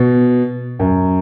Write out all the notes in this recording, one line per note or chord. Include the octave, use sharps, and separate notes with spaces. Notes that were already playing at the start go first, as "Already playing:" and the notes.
Already playing: B2
F#2